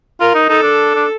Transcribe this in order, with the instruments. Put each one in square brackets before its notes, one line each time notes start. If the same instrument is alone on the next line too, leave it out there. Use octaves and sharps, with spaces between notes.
[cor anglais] F4 [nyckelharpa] A#4
[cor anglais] D#4
[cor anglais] D#4 [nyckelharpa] A4
[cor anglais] D4
D4